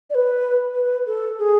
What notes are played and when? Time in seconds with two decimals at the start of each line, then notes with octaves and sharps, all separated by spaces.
0.10 D5
0.15 B4
0.74 B4
1.07 A4
1.38 G#4